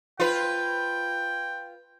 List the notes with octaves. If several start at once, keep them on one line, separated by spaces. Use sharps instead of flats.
F4 B4 G5